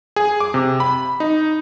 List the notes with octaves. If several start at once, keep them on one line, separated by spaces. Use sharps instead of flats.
G#4
D6
C3
B5
D#4